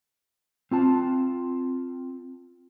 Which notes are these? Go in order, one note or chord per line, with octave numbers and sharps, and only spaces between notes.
C4 F4 A5